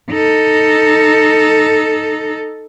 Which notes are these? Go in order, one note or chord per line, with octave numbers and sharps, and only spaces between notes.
D#4 A4